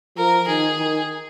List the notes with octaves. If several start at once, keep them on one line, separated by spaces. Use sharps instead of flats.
F3 A#4
D#3 G#4
D#3